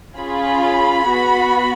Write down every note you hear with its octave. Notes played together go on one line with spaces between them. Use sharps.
C#4 F4 G#4 B5
B3 F#4